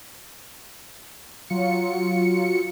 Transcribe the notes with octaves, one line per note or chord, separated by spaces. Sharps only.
F#3 F4 C#7